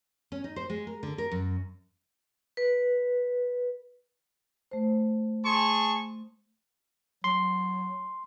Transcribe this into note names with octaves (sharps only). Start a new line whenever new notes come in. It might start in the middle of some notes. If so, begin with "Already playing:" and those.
C#4
D#4
C5
G#3
A#4
D3
A#4
F#2
B4
A3 C5
G#4 A5 C6 C#6
F#3 C6